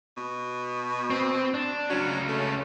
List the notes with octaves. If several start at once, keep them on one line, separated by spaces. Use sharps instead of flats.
B2
C4
D4
C#2 F#3 C#4
A3